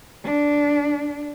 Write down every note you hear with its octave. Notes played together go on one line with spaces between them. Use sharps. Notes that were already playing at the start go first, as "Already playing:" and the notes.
D4